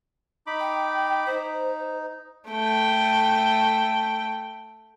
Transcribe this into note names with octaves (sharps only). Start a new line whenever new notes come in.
D#4 B5 D6
G5
D#4 C5
A3 G5